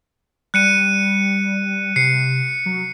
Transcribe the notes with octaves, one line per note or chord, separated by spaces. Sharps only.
G3 F#6 C#7 D#7
C3 C7 C#7
F#3